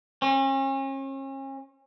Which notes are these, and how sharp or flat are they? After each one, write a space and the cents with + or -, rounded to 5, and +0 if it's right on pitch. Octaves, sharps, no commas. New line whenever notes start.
C#4 -40